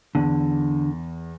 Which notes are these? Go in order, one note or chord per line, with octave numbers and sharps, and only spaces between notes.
E2 D3